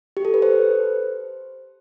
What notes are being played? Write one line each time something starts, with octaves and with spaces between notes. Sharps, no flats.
G4
A4
B4
C5